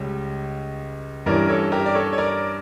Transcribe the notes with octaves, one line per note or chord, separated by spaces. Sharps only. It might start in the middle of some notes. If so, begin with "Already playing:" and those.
Already playing: C#2 C#3 G3 C#4
G2 E3 G3 C#4 A#4 D5
A4 C#5
G4 A#4
D5
A4 C#5
C#5
A#4 D5